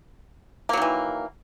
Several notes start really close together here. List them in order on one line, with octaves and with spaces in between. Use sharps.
A#3 F#3 D#3 E3